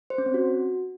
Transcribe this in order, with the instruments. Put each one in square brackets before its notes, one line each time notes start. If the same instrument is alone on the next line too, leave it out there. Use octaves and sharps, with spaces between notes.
[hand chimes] C5
C#4
C4
F#4